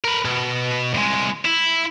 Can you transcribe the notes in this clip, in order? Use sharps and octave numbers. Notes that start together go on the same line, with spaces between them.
A#4 B4
B2
C2 G#3
E4